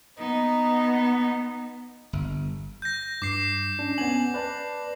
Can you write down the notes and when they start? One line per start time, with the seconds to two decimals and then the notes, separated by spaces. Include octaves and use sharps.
0.18 B3 D#4
2.13 G1
2.82 G6 A#6
3.22 G2 D6 C7
3.79 C#4 D4
3.98 B3 C#4 G#5 F#7
4.34 B4 D5 A5